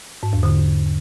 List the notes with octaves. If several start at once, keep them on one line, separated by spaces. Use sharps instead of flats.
G#2
E2
D3